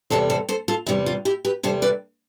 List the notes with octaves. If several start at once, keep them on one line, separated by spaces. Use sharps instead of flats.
E2 C3 G3 A4 C5
A4 C5
A4 C5
F4 A4
E2 C3 G3 E4
F4
E4 G4
G4 B4
E2 C3 G3 A4 C5
B4 D5